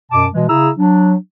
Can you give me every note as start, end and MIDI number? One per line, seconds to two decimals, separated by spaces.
0.11 0.25 42
0.11 0.25 47
0.11 0.25 81
0.11 0.25 86
0.33 0.44 47
0.33 0.44 52
0.33 0.44 56
0.48 0.69 49
0.48 0.69 64
0.48 0.69 68
0.48 0.69 82
0.48 0.69 88
0.76 1.13 54
0.76 1.13 62